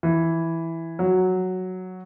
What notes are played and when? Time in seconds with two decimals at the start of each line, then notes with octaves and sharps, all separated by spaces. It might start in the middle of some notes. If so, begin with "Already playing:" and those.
0.03 E3
0.99 F#3